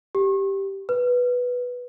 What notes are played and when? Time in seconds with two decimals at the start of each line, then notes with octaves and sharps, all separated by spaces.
0.15 G4
0.89 B4